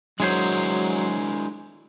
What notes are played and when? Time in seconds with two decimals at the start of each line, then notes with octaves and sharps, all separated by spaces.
0.20 F#3 G#3 D4 E4 G#4 A#4 C5